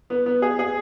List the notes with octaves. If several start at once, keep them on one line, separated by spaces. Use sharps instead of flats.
B3
B3
G#4
G#4